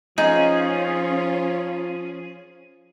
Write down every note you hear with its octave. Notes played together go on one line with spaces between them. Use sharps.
F3 C#4 D#4 F4 G#4